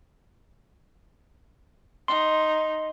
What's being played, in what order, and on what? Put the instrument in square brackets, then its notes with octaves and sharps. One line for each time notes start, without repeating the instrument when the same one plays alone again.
[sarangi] D#4 [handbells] C6